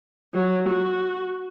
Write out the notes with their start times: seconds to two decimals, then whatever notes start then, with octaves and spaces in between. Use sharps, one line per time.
0.33 F#3
0.68 F#4